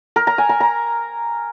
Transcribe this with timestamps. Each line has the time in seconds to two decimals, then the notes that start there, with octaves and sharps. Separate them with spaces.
0.16 A#4
0.27 A#5
0.38 G#5
0.49 A#5
0.60 A#5